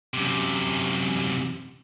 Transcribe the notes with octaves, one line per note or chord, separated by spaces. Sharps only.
F#2 C3